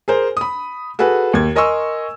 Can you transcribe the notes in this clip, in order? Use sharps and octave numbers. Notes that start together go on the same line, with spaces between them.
G#4 A#4 C5
B5 D#6
F#4 G#4 A4 B4
D#2 G#6
A#4 D#5 G#5 C6 C#6 E6